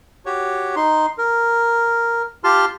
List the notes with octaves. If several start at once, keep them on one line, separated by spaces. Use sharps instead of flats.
F#4 G4 C#5
D#4 C6
A#4
F4 G4 A5 C6 F6